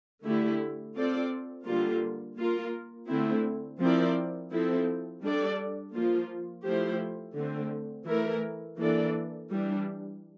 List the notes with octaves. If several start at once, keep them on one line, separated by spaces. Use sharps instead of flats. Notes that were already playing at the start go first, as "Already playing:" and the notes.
D3 A3 E4 G4
C4 F4 A4 D5
D3 G3 A#3 F4
A#3 F4 A#4
D3 A3 C4 E4
F3 C4 E4 A#4 D5
F3 C4 E4 A4
G3 D4 A4 D5
F3 A#3 F4
F3 A3 E4 G4 C5
D3 A3 C4
E3 A3 E4 A#4
E3 A#3 D4 A4 D5
E3 G3 D4